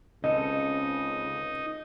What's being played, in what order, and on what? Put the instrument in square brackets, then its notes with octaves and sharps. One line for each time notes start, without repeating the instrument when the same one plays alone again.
[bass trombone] C#2 [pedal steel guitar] C#3 C4 A4 [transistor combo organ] D#4 [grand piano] D#5